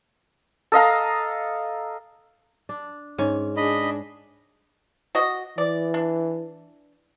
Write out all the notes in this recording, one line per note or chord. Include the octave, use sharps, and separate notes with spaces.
A4 D#5 F5 A#5
D4
G#2 C#4
D4 G#4 D#5 B5
F#4 D#5
E3 D5
D4